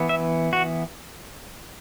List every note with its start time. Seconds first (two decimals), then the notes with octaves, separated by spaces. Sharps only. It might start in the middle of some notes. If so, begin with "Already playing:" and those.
Already playing: E3 B3
0.09 E5
0.53 F#4